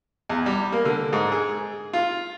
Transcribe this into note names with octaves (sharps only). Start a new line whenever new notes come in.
E2
G3
A#3
D3
G#2
G#4
F4